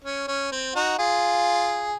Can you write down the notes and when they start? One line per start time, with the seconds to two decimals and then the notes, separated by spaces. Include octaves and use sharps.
0.04 C#4
0.28 C#4
0.52 C4
0.75 D#4 F#4
0.98 F4 G#4